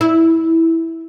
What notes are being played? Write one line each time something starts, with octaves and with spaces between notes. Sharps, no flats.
E4